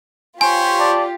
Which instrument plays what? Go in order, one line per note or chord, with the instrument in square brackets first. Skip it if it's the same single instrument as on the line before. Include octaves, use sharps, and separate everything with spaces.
[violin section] F4 G4 [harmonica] C5 C#5 [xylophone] G#5
[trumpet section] D5 A5